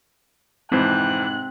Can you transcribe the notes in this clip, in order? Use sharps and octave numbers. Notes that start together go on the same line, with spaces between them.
F2 G#2 E3 C4 C5 F#6